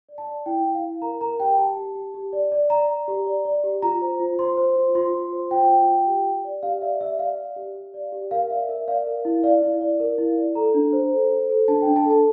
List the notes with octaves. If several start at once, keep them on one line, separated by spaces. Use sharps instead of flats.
D5
A5
D5
E4 G5
E4
F5
E4
A#4 A#5
A#4 A#5
G4 G5
G4 A5
G4
G4
G4
D5
D5
D5 A#5
D5
G4
D5
D5
G4
F4 A#5
C5
F4
C5 C6
C5
F4
F4 C6
F4
C5
F4 G5
F4
F4
G4
G4
D5
G4 F5
D5 E5
G4 E5
D5 F5
D5
G4
G4
D5
G4
A#4 F5
D5 E5
A#4 E5
D5 F5
A#4
E4
D5 F5
E4
D5
A#4
E4
D5
A4 A#5
D4
C5
A4
C5
A4
D4 A5
D4 G5
A5
A4
A5